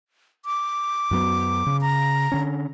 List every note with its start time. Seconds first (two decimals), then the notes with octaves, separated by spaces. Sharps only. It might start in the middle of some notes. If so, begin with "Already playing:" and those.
0.45 D6
1.11 F#2 F#3 B3
1.66 C#3
1.81 A#5
2.32 D3 C#4